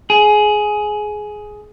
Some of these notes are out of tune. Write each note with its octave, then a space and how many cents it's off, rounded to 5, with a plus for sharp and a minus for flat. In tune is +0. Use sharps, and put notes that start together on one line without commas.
G#4 +15